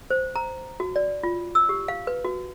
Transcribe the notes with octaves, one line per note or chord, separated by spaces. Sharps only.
C5
A#5
F#4
D5
F4
E6
G4
F5
B4
F#4